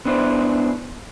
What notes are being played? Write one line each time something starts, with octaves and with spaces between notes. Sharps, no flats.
B3 D4 E4 C5